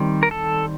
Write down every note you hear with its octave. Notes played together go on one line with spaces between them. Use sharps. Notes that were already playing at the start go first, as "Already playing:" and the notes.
Already playing: D#3 G3 C4
A#4
A4